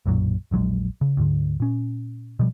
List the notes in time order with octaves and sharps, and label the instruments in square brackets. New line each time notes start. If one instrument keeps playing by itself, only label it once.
[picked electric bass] B1 F#2 A#2 F#3
E1 A#1 F#3 G#3
C#3
D2 G#2 D3
A#2 C#4
B2 F3 G3